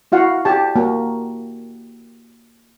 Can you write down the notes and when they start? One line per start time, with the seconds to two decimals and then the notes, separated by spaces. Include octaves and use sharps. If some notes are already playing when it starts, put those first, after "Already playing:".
0.12 E4 F#4 F5 F#5
0.45 G4 A5
0.76 A#3 F#4